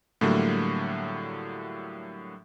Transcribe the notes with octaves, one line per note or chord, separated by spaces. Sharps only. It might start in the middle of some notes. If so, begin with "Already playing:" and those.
A2 D3 F#3 G3 A3 A#3